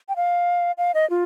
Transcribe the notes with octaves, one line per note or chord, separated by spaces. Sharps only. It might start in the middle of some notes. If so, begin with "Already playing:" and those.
G5
F5
F5
D#5
F4